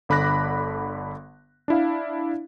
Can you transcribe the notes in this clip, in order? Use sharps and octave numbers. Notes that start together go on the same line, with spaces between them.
G1 D3 B5 D6 F#6 A#6
D4 E4 F5